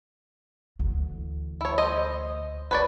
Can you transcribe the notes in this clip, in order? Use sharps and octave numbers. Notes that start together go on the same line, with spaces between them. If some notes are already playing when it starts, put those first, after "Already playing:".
D2 E3
E4 C#5
C5 D#5
G#3 B4 C#5 D5